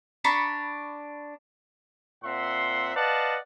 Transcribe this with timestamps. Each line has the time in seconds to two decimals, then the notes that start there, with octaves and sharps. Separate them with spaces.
0.24 D4 A#5 B5 C#6
2.24 A#2 C4 E5 F#5 C6
2.95 B4 D5 D#5 F5 F#5 A5